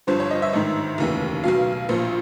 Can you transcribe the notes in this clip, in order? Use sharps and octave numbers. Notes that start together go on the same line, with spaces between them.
G1 G2 D3 F3 C5
C#5
D#5
E5
A1 G#2 D#3
F1 D#2 C#3 E3
B1 B2 F#3 F5
A#1 A#2 F3